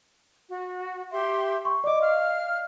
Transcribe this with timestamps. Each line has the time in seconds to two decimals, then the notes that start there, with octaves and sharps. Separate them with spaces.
0.49 F#4
1.11 G4 E5 C6
1.65 C6 C#6
1.84 D5 D#5 D6
2.01 F5 F6